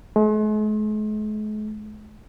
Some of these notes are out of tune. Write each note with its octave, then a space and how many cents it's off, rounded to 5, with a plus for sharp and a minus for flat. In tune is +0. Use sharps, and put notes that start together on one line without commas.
G#3 +45